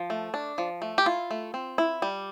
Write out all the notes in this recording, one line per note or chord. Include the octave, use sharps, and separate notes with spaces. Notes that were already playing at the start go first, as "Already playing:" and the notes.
Already playing: F3
A3
D4
F3
A3
G4
E4 F4
A3
C4
E4
G3